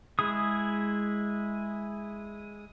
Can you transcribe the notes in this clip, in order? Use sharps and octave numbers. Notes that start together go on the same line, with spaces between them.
G#3 E4 G#4 D#6